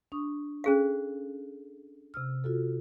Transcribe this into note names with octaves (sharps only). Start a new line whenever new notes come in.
D4 C#6 D#6
C#4 G#4 A4 F5 F#6
C3 E6 F6
F4 F#4 A4